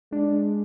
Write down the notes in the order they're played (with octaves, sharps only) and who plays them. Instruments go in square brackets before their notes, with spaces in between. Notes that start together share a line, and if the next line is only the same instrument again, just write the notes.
[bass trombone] G#3 [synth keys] D4